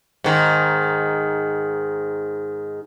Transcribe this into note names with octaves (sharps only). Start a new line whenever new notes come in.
G#2 D#3